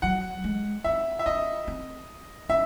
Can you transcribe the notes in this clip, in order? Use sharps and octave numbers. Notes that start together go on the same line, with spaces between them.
F#3 F#5
G#3
C4 E5
E5
C#4 D#5
C4
C#4 E5